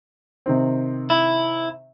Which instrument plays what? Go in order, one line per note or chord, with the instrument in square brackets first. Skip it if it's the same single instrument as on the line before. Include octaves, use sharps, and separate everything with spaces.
[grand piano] C3 D#3 C4
[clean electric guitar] E4